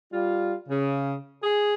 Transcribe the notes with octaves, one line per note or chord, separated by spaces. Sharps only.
G3 F4
C#3
G#4